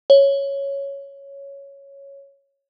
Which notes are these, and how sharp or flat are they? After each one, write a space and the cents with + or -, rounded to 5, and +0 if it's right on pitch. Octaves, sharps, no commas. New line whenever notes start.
C#5 +0